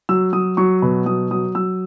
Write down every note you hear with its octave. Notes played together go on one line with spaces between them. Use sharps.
F#3 E6
F#3 D#6
F#3 C#6
B2 B5
F#3 D#6
F#3 D#6
F#3 E6